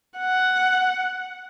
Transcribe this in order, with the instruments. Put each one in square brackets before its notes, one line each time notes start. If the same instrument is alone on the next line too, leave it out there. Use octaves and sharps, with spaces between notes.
[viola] F#5